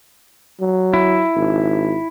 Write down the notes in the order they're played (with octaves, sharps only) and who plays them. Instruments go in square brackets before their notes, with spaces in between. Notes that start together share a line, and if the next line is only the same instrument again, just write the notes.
[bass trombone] F#3
[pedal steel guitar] E4
[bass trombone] G#1